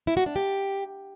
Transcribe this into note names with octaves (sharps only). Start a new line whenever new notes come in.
E4
F#4
D4
G4